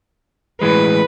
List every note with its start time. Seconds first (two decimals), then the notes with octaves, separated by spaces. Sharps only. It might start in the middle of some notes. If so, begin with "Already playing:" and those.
0.62 A2 E3 G#3 B4